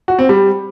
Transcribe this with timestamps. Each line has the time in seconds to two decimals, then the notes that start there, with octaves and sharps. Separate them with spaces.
0.08 F#4
0.19 C4
0.29 G3